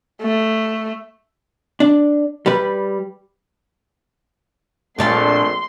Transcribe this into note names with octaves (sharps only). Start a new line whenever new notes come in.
A3
D4
G3 B4
A#1 F2 A#2 A3 D4 F5 C6